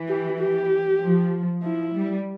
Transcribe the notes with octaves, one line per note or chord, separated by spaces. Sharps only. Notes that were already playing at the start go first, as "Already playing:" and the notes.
Already playing: E3
G4
G4
F3
F3 E4
G3